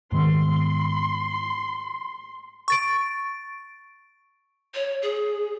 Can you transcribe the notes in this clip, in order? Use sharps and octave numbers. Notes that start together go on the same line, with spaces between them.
G#2 D#3 B3 C6
C#6 A6 D7
C#5
G#4